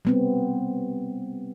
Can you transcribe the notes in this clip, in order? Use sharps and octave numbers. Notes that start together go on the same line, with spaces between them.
G3 B3 C4